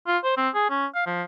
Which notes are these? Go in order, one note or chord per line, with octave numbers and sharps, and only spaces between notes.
F4
C5
C4
G#4
C#4
F5
F3